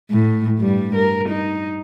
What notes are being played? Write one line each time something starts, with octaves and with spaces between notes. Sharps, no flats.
A2
G2 G3
A#4
D#4